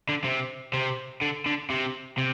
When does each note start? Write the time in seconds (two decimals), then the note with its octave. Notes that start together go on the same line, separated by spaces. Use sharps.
0.09 D3
0.24 C3
0.74 C3
1.21 D3
1.46 D3
1.70 C3
2.18 C3